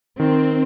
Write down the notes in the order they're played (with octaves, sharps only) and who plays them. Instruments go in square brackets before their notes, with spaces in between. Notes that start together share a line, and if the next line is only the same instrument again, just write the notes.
[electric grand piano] D#3 [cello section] C4